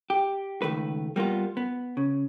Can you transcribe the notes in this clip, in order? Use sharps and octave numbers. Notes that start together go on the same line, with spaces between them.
G4
C#2 D#3 A3 B4
G3 A#3 B3 F4
B3
C#3